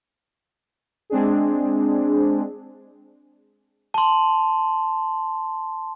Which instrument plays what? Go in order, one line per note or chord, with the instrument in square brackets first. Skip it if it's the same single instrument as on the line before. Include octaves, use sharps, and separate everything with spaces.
[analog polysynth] G#3 C4 D4 G#4
[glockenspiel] A5 C6